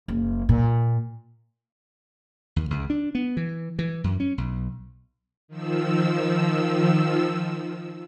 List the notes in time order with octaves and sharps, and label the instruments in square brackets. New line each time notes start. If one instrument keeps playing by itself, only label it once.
[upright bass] F#1
A#2
[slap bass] D#2
C#2
D4
B3
E3
E3
F#2
C#4
B1
[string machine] D#3 F3 E6